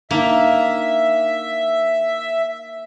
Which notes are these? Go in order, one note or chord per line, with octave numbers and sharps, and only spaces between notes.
A#3 D4 D#4 E5